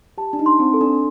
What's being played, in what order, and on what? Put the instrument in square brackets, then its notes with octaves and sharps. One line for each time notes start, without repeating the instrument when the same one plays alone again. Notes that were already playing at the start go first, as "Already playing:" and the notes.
[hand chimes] G4 [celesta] A5
[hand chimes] D4
D#4
[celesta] C6
[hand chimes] C4
[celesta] A4
[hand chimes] D4